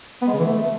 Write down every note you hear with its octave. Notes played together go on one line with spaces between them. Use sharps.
B3
G#3
C#3
E3
A3